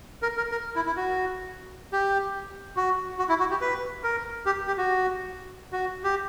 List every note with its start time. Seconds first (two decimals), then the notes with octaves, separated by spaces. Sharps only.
0.22 A#4
0.37 A#4
0.51 A#4
0.76 E4
0.86 E4
0.97 F#4
1.93 G4
2.77 F#4
3.19 F#4
3.29 E4
3.40 F#4
3.50 G4
3.61 B4
4.04 A#4
4.46 G4
4.67 G4
4.78 F#4
5.73 F#4
6.04 G4